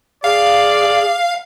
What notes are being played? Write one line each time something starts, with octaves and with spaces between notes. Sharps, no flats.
G#4 D5 F5